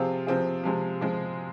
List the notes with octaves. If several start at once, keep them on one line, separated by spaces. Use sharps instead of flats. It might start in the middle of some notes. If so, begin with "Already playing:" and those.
Already playing: C3 F3 C4 F4 G#4
C3 F3 C4 F4 G#4
C3 F3 G#3
C3 F3 G#3